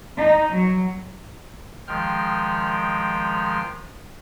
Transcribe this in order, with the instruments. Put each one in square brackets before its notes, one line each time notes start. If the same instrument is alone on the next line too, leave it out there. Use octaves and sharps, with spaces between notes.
[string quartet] D#4
F#3
[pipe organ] D#3 F3 G#3 G5 F6